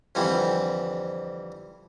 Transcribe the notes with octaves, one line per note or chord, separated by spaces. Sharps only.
F2 D3 E3 G3 C4